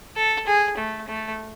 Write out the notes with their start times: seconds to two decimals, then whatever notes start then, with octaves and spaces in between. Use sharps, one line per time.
0.16 A4
0.47 G#4
0.78 A3
1.08 A3